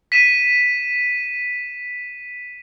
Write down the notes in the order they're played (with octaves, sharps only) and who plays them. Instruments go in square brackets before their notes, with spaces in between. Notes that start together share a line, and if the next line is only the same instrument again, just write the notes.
[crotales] B6 D#7 E7